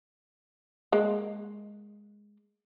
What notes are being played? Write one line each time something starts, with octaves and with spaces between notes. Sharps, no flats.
G#3 A#3